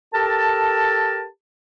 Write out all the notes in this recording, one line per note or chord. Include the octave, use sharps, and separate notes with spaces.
G4 A4 A#4 A5